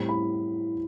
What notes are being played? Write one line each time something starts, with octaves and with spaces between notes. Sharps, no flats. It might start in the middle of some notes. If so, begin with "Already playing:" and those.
Already playing: A2 G3 C4
B5